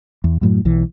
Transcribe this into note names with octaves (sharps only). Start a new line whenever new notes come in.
E2
F#2 A2 F#3
B1 E3